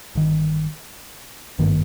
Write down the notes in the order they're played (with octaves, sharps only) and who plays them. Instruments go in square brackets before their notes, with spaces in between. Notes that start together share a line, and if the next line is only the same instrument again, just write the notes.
[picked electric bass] G1 G2 D#3
G#1 G2 D#3 A#3